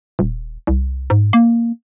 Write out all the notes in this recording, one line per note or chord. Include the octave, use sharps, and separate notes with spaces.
D#1
C2
G#2
A#3